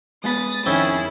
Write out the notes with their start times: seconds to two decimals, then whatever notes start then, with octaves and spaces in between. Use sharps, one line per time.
0.24 G#3 B3 B5 D#6 A6
0.66 F2 D#3 C4 C#4 E4 G#4